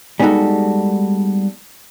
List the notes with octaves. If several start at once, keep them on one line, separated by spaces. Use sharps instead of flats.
G3 G#3 B3 D#4 F#4 A4